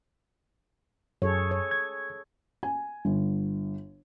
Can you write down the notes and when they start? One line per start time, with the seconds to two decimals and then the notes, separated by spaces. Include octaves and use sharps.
1.22 F#2 G#4 A4 C#5
1.51 C#5
1.71 G#6
2.63 G#5
3.05 G1